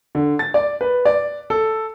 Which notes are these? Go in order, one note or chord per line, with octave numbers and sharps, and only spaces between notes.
D3
A6
D5
B4
D5
A4